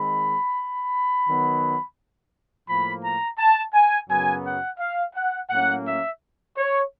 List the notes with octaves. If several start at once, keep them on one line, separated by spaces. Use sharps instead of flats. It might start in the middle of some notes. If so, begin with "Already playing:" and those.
Already playing: D#3 G#3 C4 B5
D#3 F#3 B3
A2 F3 A#3 B5
A#5
A5
G#5
F#2 C#3 F#3 B3 G#5
F#5
F5
F#5
A2 F#3 A#3 C#4 F#5
E5
C#5